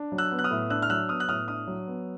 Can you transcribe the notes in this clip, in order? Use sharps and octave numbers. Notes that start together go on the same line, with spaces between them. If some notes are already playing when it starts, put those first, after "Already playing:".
Already playing: D4
F#3
E6 F#6
B3
F#6
D#6 F6
A2
D4 E6 F#6
F6
F#3 E6 F#6
B3 D#6 F6
F#6
A2 D#6 F6
D4 D#6 F6
F#3
B3